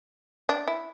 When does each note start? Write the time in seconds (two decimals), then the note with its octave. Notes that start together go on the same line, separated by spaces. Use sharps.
0.49 D4
0.68 E4